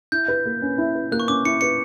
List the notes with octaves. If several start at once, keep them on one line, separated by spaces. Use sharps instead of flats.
E4 G6
B4
A#3
C#4
E4
B4
A#3 F#6
C#6
C#4 D6
E4 C#7
B4 C#7